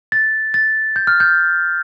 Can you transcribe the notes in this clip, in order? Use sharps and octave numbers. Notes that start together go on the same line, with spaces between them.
A6
A6
G6
F6
G6